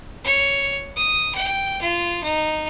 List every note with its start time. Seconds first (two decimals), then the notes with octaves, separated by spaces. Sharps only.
0.24 C#5
0.96 D#6
1.35 G5
1.81 F4
2.23 D#4